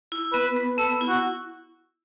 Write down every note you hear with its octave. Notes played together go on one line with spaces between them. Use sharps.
E4
B3 B4
B4
B3 A4
E4
F#4